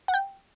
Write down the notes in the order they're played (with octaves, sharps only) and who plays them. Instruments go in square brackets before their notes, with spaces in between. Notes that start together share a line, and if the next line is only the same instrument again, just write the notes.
[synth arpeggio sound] F#5
G5